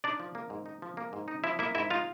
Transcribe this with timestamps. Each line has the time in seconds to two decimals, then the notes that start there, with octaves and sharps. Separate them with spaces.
0.04 D4 D#4 D5
0.20 F3
0.35 A#3
0.50 G#2
0.66 D#4
0.82 F3
0.97 A#3
1.13 G#2
1.28 D#4
1.44 F3 E4 E5
1.59 A#3 E4 E5
1.75 G#2 E4 E5
1.90 D#4 F4 F5